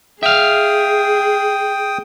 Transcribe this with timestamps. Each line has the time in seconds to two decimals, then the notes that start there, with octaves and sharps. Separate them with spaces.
0.23 G#4 E5 F5 G5 D#6